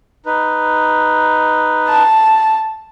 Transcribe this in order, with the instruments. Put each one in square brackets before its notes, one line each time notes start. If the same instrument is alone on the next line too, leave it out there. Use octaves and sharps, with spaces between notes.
[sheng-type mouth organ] D#4 B4
[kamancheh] A5